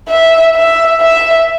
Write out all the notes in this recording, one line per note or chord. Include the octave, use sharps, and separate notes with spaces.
E5
E5
E5